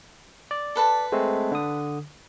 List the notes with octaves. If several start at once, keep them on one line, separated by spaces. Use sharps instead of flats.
D5
A4 B4 A5
G#3 A3 C4
D3 D#6